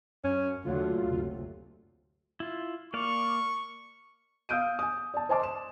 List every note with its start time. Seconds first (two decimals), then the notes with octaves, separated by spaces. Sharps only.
0.24 F#2 C#4
0.65 D#2 D3 F#3 A3 F4
1.05 F#1 D2 C3
2.40 E4 F4
2.94 A#3 D5 F5 C#6
4.49 F5 D#6 E6 G6 D7 D#7
4.79 G#5 D#6
5.14 D5 A5
5.29 C5 D#5 G#5 A5 C6 D6
5.43 E7